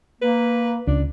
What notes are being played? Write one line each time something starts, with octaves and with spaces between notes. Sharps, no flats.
A#3 B4
C#2 D4